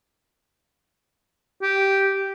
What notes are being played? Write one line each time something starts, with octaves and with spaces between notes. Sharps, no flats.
G4